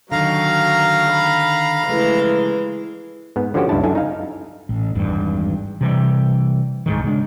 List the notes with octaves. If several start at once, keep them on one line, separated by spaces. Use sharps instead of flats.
D3 D#3 F#3 F5 A#5
B5
C#3 E3 F3 G#3 A3
G#2 B3
D3 F3 C#4 F#4 G4
C#2 G2 D4 E4 A5
F#2 D4 E4 A4 G#5
D#4 F5
A1
G#1 E2 G2
C3 E3 G3
C2 G#2 D#3
C#3 G#3 B3 D4